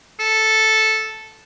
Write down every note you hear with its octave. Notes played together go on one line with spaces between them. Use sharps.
A4